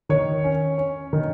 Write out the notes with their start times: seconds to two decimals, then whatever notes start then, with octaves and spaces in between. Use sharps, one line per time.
0.09 D#3 C#5
0.44 C#4
0.78 C#4
1.13 D#3